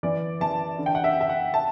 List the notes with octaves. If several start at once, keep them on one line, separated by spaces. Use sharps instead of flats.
E3 D5
E3 A5
D3
G5
F#5
E5
D3 E5
F#5
A5